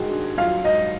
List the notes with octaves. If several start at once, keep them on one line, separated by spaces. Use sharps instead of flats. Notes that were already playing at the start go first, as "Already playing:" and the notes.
Already playing: G#2 D#3 F#4 G#4
D4
F#3 F4 F5
G#2 D#4 D#5